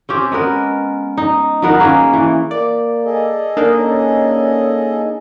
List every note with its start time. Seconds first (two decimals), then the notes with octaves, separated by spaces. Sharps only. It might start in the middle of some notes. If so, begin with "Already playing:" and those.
0.09 C4 C#4 G4
0.32 G#3 B3 A#4
1.17 D#4
1.62 D#3 F#3 B3 A#4
1.80 A#3 C#4 D#4 G#4
2.13 E3
2.51 A#3 D5
3.06 G#4 A4 D#5
3.57 A#3 D4 D#4
3.79 C#4